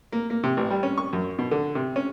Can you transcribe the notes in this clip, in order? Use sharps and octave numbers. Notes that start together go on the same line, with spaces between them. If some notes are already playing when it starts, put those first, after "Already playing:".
A#3
A#3
C3
A1
G3
C#4
C#6
F#2
B2
D3
C3
C#4